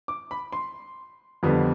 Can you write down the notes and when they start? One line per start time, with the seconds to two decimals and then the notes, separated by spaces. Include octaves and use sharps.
0.08 D6
0.31 B5
0.53 C6
1.43 F2 D3 G3 B3